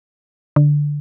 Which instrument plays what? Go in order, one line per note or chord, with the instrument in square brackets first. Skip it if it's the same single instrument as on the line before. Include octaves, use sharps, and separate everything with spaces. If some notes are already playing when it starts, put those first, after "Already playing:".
[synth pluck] D3